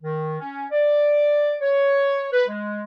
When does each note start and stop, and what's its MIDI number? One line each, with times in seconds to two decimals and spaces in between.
0.03 0.35 51
0.40 0.65 61
0.72 1.55 74
1.61 2.27 73
2.33 2.43 71
2.48 2.82 56